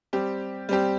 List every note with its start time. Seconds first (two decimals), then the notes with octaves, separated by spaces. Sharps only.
0.13 G3 C4 G4
0.69 G3 C4 G4